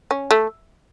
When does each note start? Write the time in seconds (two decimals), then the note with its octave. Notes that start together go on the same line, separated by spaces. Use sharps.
0.11 C#4
0.31 A3